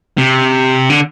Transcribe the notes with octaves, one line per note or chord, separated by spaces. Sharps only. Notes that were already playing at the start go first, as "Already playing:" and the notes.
C3
D3